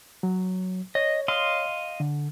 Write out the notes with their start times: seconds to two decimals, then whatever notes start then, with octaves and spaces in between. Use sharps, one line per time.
0.23 F#3
0.95 C#5 D#5
1.28 D#5 F5 C6
2.00 D3